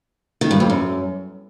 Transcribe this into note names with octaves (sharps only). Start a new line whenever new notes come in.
D#3
G2
F2
F#2